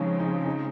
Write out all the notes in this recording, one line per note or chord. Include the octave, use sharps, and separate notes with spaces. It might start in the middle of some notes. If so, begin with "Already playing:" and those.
Already playing: C#3 F3 G#3 C4 C#4 D#4
D#4
D#4